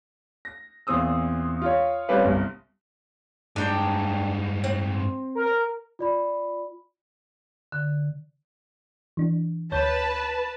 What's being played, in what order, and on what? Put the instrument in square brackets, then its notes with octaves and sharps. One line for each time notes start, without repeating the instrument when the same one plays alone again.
[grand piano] A#6
E2 A#2 C4 D#6 E6
F4 C#5
G3 C4 C#4 G4 B4 F5
G1 C2
[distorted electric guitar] G2 G#3 [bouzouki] D4 G5 A#5
[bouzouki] C4
[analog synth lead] A#4
[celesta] F4 D5 B5
[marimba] D3
[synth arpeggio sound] E3 D4
[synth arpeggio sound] D2 C#5 G6 [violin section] B4 A5